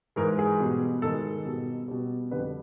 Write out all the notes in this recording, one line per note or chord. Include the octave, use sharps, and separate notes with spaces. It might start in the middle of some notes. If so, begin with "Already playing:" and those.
G#2 E3 G#3 A#4
G#4
B2 G3
G#2 D#3 G#3 A4
B2 G3
B2 G3
F2 D3 G3 B4